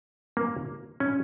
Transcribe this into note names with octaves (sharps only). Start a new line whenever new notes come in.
A#3
C#4